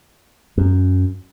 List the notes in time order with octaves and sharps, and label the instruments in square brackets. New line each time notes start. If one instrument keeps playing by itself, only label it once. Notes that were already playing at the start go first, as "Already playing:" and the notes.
[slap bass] F#2